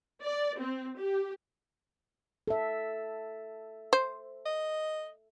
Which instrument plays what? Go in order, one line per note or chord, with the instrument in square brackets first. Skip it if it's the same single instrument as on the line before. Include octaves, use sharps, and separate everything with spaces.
[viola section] D5
C4
G4
[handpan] A4 E5
[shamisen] C5
[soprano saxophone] D#5